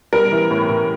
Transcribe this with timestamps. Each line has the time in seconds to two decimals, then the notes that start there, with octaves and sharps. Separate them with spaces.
0.13 G3 A#4
0.32 E3
0.51 A2
0.69 A2